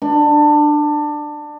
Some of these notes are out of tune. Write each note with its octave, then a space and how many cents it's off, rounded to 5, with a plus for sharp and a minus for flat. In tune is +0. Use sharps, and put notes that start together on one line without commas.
D4 +20